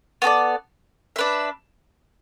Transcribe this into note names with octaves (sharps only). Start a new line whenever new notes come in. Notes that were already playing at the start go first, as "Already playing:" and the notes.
B3 F#4 A4 D5
D4 B4 E5